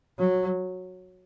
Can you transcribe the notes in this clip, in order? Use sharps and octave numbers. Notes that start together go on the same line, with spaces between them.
F#3